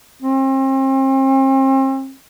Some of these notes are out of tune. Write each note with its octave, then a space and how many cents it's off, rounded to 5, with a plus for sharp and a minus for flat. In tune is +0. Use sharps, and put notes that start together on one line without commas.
C4 +40